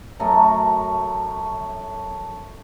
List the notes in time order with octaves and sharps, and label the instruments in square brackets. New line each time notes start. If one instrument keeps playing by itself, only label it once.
[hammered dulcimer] F#2 A3 A5 A#5